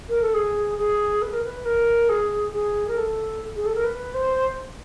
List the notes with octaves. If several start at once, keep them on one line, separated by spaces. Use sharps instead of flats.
A#4
A4
G#4
G#4
B4
A#4
B4
A#4
G#4
G#4
A#4
A4
G#4
A4
A#4
B4
C5